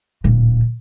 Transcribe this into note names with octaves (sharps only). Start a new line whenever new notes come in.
D1 A#2